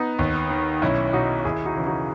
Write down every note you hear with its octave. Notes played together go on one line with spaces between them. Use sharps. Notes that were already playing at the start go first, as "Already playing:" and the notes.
Already playing: B3 D#4
D#2
D#3
B1 C#4 E4
B2 D#4 F#4
D#2 E4 G#4
D#4 F#4
C#3 E3
D#4 F#4